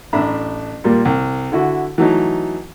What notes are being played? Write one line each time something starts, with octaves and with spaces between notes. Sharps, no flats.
A1 D4 E5 A#5 B5
A#2 G3 A#3
C2
D3 E4 F#4
E3 F#3 A3 D#4